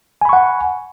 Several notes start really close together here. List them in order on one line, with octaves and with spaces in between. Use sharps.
G#5 B5 C#6 F#5